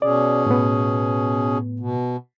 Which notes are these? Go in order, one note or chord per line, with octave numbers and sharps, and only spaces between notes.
B2 C#4 G#4 D5
A2 B3
B2